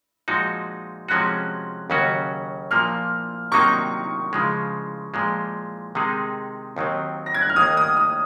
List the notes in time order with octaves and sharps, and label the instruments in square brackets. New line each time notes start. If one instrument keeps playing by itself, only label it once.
[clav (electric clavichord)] A#2 F3 G#3 D#4 F#4
[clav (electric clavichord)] C3 F3 G#3 C#4 F#4 [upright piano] F#6
[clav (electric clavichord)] D#2 C#3 F#3 C#4 F#4
[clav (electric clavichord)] A#2 F3 A#3 [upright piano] F6
[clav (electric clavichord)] C3 D#3 F#3 A#3 D#4 [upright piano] C#6
[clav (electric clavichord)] C#3 F3 G#3
A#2 F3 G#3
C3 D#3 G#3 D#4 G#4
D#2 D#3 F#3 C4
[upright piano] A#6
G#6
F#6
F6
[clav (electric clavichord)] D#2 D#3 A#3 [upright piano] D#6
[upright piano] D#6
D#6